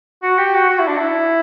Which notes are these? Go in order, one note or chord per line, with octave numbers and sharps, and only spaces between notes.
F#4
G4
F#4
F#4
E4
D4
E4